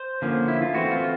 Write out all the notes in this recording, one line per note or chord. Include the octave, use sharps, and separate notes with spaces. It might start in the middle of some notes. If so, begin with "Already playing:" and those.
Already playing: C5
D3 F3 A#3 C#4
E4
F4
E3 A3 C4 F#4
F4